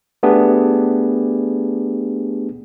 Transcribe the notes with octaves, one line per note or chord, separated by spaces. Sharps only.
A3 B3 D4 G4 G#4